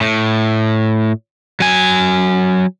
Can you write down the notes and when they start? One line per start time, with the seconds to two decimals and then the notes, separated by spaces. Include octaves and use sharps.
0.01 A2
1.60 F#3 G#5